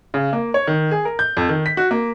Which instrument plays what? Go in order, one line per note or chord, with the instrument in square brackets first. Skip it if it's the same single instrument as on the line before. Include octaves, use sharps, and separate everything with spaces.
[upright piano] C#3
A#3
C#5
D#3
G#4
A#4
G6
F2
D#3
B6
F#4
A#3